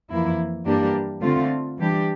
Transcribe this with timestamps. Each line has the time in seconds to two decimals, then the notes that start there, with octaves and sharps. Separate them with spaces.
0.10 F2 E3 A#3 E4
0.66 G2 E3 A#3 D4 G4
1.22 D3 A3 C4 F4
1.78 E3 G3 D4 G4